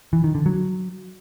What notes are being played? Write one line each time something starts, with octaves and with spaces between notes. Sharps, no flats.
E3
D#3
D3
F#3